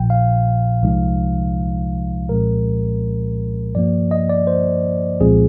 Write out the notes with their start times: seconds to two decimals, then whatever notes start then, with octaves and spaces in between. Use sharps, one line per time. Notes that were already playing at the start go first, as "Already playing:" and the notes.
Already playing: A#1 A#2 F3 G5
0.10 F5
0.83 C2 C3 F3 G#3 D#4
2.28 C2 A#2 F3 G#3 C4 A#4
3.74 G2 F3 A#3 D5
4.11 D#5
4.29 D5
4.47 C5
5.20 C2 A#2 F3 G#3 C4 G#4